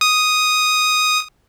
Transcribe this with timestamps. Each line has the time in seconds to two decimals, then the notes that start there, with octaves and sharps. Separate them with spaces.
0.01 D#6